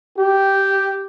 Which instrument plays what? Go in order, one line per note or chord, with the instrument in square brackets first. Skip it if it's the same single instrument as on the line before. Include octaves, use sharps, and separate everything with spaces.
[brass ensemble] G4